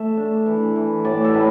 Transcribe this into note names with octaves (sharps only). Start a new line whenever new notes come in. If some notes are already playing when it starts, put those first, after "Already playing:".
Already playing: A3 E5
D4
E3
E3
A2 D5
A4
A2 B4